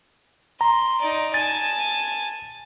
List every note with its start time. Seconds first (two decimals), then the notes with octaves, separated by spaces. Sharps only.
0.61 A#5 C6
1.01 D#4 D5
1.34 G#5 A5 A6